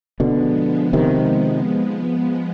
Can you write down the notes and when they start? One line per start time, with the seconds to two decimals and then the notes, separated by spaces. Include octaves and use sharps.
0.20 B2 D3 F3 G#3 B3
0.93 C3 D#3